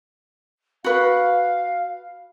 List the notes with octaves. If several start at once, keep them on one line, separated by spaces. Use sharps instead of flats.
F#4 B4 F5